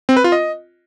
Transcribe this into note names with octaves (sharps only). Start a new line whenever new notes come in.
C4
B4
F4
D#5